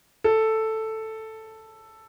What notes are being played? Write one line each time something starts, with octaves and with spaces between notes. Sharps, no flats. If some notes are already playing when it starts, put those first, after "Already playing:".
A4